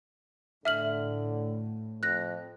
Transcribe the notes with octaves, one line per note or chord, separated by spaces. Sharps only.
A2 D3 E5 F6 F#7
F2 F#6 A#6